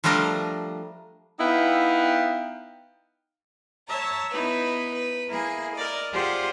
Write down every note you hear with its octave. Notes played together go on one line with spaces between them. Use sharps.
F3 G3 A3 D4 A#4 D#5
B3 D#4 E4 F5 G5
C#5 E5 A5 A#5
B3 D#4 E4 B4
B4
A#3 E4 G#4
A#4 D5 D#5
F4 G4 G#4 C5 D5 F#5